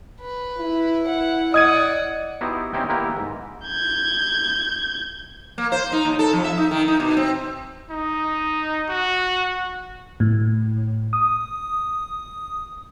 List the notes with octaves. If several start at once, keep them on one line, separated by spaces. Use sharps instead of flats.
B4
E4
F#5
D5 D#5 F#5 D#6 G#6 D#7
B3 D#4 E4 F#4 G4 C5
C4 C#4 D#4 E4 G4 G5
G3 A#3 B3 E4 G4 A#4
G#2
G6 G#6
A#3
C5
D#4
D#2
A4
F2
E5
D#4
D#3
D#4
B2
C4
D#4
F#4
A2
D#6